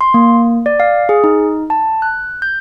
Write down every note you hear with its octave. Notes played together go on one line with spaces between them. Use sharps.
C6
A#3
D5
F5
G#4
D#4
A5
F#6
G6